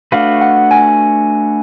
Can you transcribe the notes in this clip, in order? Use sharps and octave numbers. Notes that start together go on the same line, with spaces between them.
A3 D4 F#4 B4 F5
F#5
G#5